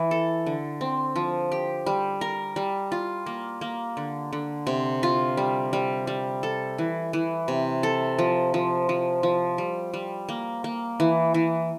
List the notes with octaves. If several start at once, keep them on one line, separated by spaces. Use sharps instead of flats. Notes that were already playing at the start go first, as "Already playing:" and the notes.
Already playing: E3
A4
D3
C4
F3
G4
G3
A#4
G3
F4
A#3
A#3
D3
D3
C3
F4
G3
G3
G3
A4
E3
E3
C3
A4
F3
F3
F3
F3
G3
G3
A#3
A#3
E3
E3